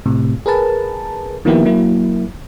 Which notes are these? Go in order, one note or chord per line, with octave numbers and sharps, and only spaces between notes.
A2 C3
G#4 A#4 B4 A5
D#3 F3 A#3 B3 E4 G4
F#3 A#3 E4